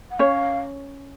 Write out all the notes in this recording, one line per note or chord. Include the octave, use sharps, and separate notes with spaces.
F#5
C#4 C#5 F5